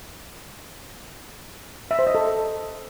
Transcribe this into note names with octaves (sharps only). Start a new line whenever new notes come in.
E5
C5
D#5
A4